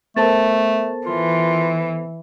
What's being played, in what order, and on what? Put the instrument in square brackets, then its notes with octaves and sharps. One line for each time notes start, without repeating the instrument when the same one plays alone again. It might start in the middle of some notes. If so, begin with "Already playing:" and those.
[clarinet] A3 [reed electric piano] B3 A4 C5 [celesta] A#4 A5 A6
[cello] E3 [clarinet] F4